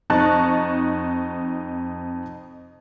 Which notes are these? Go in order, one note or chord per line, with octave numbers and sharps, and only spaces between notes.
F2 D#4 A5 C#6 F#6 A6